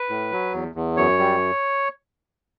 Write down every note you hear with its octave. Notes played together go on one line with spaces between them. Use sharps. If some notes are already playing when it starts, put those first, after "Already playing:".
Already playing: B4
A2
F#3
E2
E2
F#2 C#5
G3